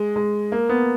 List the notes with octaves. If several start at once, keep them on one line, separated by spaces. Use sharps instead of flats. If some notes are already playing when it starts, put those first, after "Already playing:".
Already playing: G#3
G#3
A#3
B3